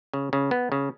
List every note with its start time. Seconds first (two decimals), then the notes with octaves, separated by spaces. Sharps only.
0.13 C#3
0.33 C#3
0.51 B3
0.72 C#3